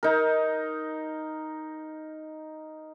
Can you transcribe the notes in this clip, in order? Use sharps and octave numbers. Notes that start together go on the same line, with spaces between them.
D#4 A#4